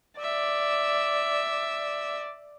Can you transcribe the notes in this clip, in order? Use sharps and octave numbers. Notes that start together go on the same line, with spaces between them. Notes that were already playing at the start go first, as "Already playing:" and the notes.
D5 E5